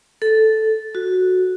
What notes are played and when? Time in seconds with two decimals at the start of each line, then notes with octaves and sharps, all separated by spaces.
0.22 A4
0.95 F#4